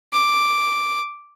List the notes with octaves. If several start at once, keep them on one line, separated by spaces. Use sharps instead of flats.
D6